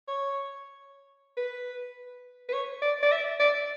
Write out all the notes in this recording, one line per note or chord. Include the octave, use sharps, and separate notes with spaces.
C#5
B4
B4
C#5
D5
D5
E5
D5